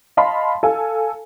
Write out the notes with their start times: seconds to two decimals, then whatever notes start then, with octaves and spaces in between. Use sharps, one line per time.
0.17 D#5 F5 A5 B5 C6
0.63 A4 F5 G#5